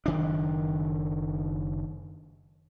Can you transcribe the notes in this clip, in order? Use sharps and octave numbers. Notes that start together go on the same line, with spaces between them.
F#1 D#3 D4